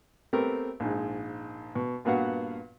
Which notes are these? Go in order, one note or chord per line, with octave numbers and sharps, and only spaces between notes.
A3 B3 C4 G4 A#4
A#1 G#2 G#3
B2
G2 A#2 B3 F#4 F5 F#5